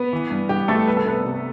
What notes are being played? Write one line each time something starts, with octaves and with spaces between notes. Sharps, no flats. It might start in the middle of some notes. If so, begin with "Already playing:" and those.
Already playing: B3 B4
E3
G2
G2 G4
G2 A3 A4
C2 B4
A4
C3 B3 B4
C3